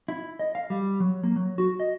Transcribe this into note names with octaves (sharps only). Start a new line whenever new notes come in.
E4
D#5
F5
G3
F#3
A#3
F#3
F#4
D#5